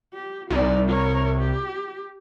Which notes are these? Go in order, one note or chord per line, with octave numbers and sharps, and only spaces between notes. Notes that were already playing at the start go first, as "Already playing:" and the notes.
G4
C2 D#4 D5
A#4 C#5
G4